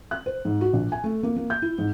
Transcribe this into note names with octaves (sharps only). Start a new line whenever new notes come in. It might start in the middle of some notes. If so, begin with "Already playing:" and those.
F#6
C5
G#2
F#4
A#1
G#5
A3
A#3
A#3
G6
E4
G#2